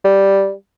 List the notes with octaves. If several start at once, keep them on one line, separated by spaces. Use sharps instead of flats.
G3